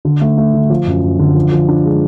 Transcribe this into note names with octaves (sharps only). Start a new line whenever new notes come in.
D3
A3
A3
D3
F3
F#2
F#2
D3
F3
F3
D4
G#3